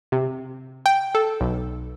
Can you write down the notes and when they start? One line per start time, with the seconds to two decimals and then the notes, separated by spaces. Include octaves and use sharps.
0.12 C3
0.86 G5
1.15 A4
1.41 B1